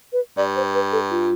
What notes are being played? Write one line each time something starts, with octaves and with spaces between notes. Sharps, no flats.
B4
G2 D5
C5
B4
A4
F4